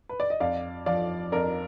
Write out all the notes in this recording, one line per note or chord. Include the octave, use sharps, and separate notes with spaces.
B4
D5
D#5
F2 D5 F5
F3 D5 F5
F2 A#4 D5